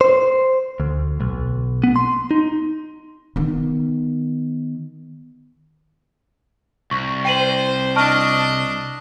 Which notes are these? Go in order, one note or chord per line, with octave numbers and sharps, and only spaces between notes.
C5
D2
B1
B3
C6
D#4
D#3 B3
C2 C#6
C5 G5 D#7 F#7
D4 D#5 A5 C#6 F6